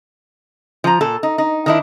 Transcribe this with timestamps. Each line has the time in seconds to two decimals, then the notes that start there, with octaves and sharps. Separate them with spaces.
0.84 F3 A#5
1.01 A#2 A4
1.23 D#4
1.38 D#4
1.66 D#3 D4 E4